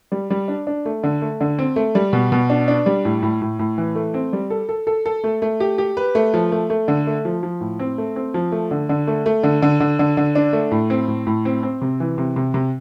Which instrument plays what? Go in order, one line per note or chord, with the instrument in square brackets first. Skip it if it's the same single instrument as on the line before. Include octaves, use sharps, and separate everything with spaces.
[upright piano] G3
G3
D4
D4
A3
D3
A3
D3
C4
A3
G3
B2
B2
D4
D4
G3
A2
A2
A2
A2
E3
A3
C4
G3
A4
A4
A4
A4
A3
A3
G4
G4
B4
A3
F3
A3
A3
D3
A3
F3
F3
A2
C4
A3
C4
F3
A3
D3
D3
A3
A3
D3
D3
D3
D3
D3
D4
A3
A2
C4
A2
A2
C4
C4
C3
E3
C3
C3
C3